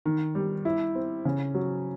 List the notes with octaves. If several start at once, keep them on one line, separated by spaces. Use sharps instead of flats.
D#3
G3
E4
C4
C#3
F#3